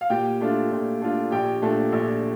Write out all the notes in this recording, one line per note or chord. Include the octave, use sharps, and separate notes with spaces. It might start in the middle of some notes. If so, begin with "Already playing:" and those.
F5
A#2 G4 G5
A3 D4 F4
A#2
A3 D4 F4
A#1 G4 G5
A#2 A3 D4
A#1